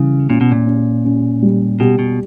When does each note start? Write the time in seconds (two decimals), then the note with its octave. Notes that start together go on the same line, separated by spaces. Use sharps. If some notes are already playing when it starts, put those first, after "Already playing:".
Already playing: C#3 E3 G3
0.30 A#2 C#4
0.41 B2
0.51 A#2
0.67 C#4
1.05 C#4
1.42 G3
1.80 B2 G4
1.99 B2